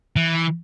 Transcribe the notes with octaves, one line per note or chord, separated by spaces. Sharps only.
E3